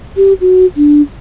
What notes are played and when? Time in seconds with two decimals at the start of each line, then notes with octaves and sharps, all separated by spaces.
0.17 G4
0.41 F#4
0.76 D4